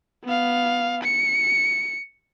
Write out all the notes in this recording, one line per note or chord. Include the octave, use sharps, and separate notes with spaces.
B3 F5
C#7